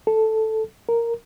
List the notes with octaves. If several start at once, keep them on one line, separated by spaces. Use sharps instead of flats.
A4
A#4